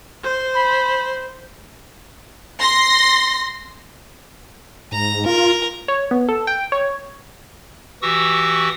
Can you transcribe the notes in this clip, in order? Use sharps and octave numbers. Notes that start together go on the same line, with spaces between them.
C5
B5
C6 A#6
G#2 A#5
F4 A#4
C#5
B3
A4
G5
C#5
E3 F#4 G4 C#6 D#6 E6